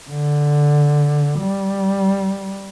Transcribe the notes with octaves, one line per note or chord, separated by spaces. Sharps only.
D3
G3